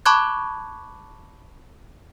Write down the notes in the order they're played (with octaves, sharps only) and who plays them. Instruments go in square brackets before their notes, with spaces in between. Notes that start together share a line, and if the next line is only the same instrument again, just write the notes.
[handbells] A5 B5 C#6 D6 F#6 G#6